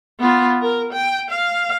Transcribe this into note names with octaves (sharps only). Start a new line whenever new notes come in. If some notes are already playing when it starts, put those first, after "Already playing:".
B3 F4
A#4
G5
F5